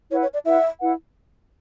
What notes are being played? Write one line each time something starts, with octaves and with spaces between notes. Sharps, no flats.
E4 B4 C#5 F#5
C#5
D5
E4 B4 E5 F#5
E4 B4 F#5